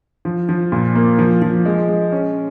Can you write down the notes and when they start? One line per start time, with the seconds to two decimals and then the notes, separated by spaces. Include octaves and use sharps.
0.25 F3
0.49 F3
0.72 A#2
0.95 A#3
1.19 F3
1.42 F3
1.65 G#3
1.89 G#3
2.12 C#4